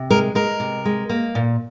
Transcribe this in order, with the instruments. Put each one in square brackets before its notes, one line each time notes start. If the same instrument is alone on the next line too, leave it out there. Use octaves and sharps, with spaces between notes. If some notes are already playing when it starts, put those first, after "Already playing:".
Already playing: [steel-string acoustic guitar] C3
G#3 A#4
G#3 A#4
C3
G#3
A#3
A#2